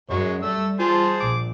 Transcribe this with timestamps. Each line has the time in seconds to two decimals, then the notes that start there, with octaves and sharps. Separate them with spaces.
0.10 F#2 F#3 G#3 C#5
0.43 G3 A3 E6
0.80 F4 G#4 C5 A5
1.20 A#1 A#2 D6